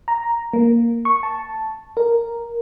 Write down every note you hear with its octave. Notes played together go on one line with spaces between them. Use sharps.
A#5
A#3
C#6
A5
A#4